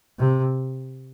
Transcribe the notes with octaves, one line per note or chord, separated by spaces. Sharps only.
C3